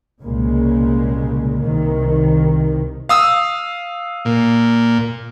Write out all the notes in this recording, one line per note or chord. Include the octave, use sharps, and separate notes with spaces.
C2 A#2 C#3 G#3 A#3
C2 C3 D#3
F5 D#6 E6
A#2